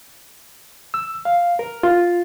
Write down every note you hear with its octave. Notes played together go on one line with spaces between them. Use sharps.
E6
F5
A#4
F4